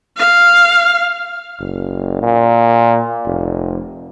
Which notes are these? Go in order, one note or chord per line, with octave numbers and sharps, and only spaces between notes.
F5
F#1
A#2
F1